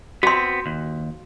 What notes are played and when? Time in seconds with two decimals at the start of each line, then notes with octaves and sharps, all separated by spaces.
0.23 B3 C4 F#4 C6
0.66 D#2